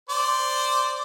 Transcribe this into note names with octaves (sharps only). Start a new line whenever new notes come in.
C5 D5